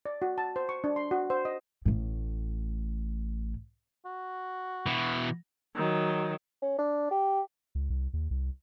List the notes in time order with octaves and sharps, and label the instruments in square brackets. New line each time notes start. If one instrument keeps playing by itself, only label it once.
[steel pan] D5
F#4
A5
C5
C#6
D4
C6
F#4
C5
D#5
[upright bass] A1 A2
[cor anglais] F#4
[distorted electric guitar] B2 E3
[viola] D#3 F#3
[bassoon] C#4
D4
G4
[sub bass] C#2
C2
D#2
C2